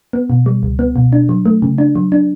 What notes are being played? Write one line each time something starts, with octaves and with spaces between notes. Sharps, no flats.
B3
B2
G3
C#2
B3
B2
D4
F#3
A3
C#3
D4
F#3
D4